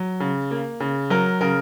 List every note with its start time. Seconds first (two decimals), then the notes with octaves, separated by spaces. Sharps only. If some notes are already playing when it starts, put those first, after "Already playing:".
Already playing: F#3
0.20 C#3
0.51 A#3
0.80 C#3
1.10 F#3 A#4
1.41 C#3 A#4